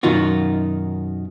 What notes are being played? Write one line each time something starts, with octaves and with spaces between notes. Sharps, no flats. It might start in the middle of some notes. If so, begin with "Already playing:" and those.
F#2 B2 D#3 D#4 F4 F#4